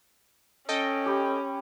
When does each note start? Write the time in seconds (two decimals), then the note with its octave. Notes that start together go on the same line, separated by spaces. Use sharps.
0.69 C#4 A4 D#5 G5
1.06 G4 B5